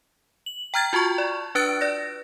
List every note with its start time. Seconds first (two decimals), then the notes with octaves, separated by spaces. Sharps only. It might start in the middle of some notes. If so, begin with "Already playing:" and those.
0.46 F#7
0.74 G5 A#5 F6 G#6 A6
0.93 F4 F#4 A5 C#6
1.18 D5
1.55 D4 B4 F#6 A6 D7
1.81 D5 A#6